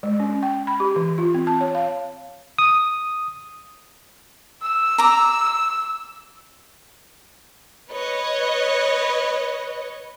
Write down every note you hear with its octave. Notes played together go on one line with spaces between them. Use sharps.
G#3
C#4
G5
B5
G4
E3
F4
C4
A5
C#5
F5
D#6
E6
A#5 D6
B4 C#5 D#5